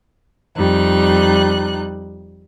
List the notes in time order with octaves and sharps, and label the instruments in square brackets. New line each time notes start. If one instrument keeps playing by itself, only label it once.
[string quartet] F2 G3 D#4 F#6